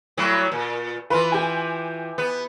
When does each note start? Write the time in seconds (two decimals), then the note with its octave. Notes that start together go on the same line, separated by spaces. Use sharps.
0.17 A2 F#3 G3
0.52 A#2
1.10 E3 F4 B4
1.32 G4 G#5
2.18 B3